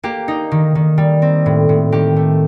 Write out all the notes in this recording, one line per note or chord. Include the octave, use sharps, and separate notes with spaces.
A#3 G4
D#4
D#3
D#3
G3
C4
A2
A2
D#3 G4
A3